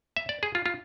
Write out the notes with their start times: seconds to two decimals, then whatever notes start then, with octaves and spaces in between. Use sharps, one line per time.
0.17 E5
0.29 D5
0.43 G#4
0.55 F4
0.66 F4